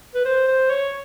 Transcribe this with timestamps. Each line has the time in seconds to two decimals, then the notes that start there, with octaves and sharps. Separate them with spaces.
0.15 B4
0.25 C5
0.48 C5
0.70 C#5